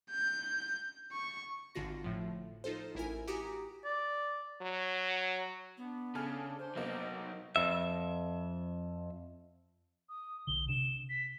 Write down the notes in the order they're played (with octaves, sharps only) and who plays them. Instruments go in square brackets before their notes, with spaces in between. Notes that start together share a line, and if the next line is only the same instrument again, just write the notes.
[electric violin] G6
C#6
[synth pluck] G#1 D3 F4 F#4 A#6
A2 F3
D#4 F4 A4 C5
A1 E4 A#4 G#5
F#4 G4 G#5 A#5 D6 D#6
[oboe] D5
[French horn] F#3
[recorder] B3 [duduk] D4
[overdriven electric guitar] C#3 [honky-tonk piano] A4 G#5 F6
[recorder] C5
[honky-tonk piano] F1 B2 A#3 [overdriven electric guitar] F#3 D#4
[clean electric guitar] F2 E5
[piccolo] D#6
[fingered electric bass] B1 D3 [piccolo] G7
[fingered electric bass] C3 D4 [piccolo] E7
[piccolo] B6